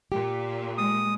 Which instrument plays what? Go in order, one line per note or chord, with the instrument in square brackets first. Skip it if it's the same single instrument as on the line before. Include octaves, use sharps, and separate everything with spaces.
[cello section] A#2 [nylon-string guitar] G4
[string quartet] G#3 [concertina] D#6